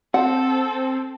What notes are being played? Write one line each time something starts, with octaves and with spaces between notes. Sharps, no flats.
C4 A4 F#5